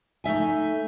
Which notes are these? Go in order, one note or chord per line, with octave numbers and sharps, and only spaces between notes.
A3 D#4 E5 G#5